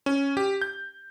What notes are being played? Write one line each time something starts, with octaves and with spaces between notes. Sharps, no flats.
C#4
G4
G6